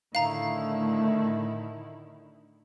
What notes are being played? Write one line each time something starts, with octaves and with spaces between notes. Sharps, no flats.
A2 D3 D#3 A3 E4 F5 A#5